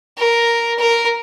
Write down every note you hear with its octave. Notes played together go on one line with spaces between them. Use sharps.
A#4
A#4